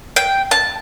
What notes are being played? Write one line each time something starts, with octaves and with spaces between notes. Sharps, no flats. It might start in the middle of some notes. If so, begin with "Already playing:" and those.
G5
A5